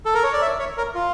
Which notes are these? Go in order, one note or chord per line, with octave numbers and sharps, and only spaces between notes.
A4
A#4
C#5
D5
E5
C#5
A#4
F4